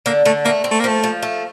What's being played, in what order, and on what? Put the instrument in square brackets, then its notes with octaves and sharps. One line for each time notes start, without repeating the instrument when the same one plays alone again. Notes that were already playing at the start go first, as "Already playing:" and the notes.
[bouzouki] D3 [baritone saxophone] A#3
[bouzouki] D3 [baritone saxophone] A3
[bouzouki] A3 [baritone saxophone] A#3
[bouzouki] C4
[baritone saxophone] A3
A#3
[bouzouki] F3 [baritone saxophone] A3
[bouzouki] F3
A3